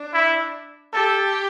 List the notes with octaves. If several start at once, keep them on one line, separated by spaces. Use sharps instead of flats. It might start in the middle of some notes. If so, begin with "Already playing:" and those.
Already playing: D4
E4
G4 A4